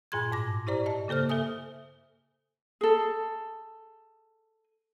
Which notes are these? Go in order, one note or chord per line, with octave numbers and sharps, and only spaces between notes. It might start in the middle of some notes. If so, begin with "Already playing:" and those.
G2 A#2 G#4 C6 G#6
G#2 D6 A#6
E4 G4 C5 D5 A#5
D#5 A5
C#3 A#3 A4 C5 F6
A4 E5 G#5 D#6
G#4 A4